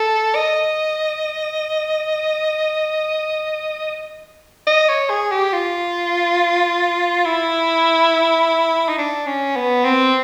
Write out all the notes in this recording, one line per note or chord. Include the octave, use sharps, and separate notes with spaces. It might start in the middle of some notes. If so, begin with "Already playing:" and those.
Already playing: A4
D#5
D#5
C#5
G#4
G4
F4
E4
D#4
D4
C#4
B3
C4